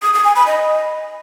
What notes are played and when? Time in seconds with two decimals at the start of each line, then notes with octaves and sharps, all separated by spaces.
0.02 D#6
0.14 D#6
0.25 G#5
0.36 B5
0.47 D#5